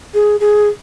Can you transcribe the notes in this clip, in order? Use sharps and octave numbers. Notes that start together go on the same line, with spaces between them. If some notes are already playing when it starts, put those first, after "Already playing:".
G#4
G#4